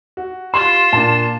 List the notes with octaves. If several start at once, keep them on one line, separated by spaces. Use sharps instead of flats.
F#4
F4 G4 C6 E7
A#2 A#3 D4 A5